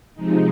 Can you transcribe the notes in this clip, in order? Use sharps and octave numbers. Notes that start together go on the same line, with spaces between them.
C3 F3 G#3 D#4